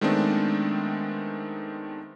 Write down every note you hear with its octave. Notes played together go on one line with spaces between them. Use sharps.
D#3 G#3 A3 B3 C4 D4